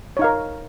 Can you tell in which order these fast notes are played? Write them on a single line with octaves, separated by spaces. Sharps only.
C#5 D#4 F5 A#4